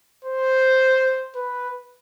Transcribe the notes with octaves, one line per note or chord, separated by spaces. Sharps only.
C5
B4